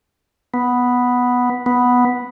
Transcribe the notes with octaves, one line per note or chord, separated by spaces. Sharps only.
B3
B3